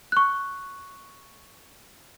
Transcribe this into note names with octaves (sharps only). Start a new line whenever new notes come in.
C#6 F#6